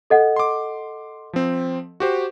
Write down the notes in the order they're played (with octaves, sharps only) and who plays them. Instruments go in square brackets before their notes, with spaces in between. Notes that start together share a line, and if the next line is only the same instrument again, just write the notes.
[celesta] A4 D#5 F#5
[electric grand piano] C6 D6
F3 C4
F#4 G4 C5